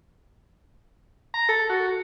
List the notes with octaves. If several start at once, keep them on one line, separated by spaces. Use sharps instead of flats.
A#5
A4
F#4